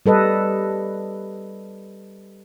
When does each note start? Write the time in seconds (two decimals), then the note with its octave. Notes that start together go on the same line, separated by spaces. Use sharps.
0.06 G3 A4 B4 D#5